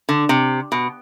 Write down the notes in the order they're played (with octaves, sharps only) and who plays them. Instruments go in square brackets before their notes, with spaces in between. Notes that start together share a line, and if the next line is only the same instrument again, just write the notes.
[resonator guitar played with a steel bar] D3
C3
B2